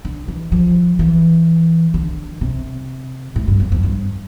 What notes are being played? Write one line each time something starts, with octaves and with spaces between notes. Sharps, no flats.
D3
E3
F3
E3
D3
C3
A2
G2
F2
F2
G2